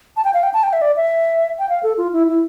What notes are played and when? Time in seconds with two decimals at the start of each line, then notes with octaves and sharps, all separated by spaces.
0.17 A5
0.24 G5
0.34 F5
0.43 G5
0.54 A5
0.63 G5
0.73 E5
0.82 D5
0.97 E5
1.59 G5
1.69 F5
1.83 A4
1.98 F4
2.13 E4
2.28 E4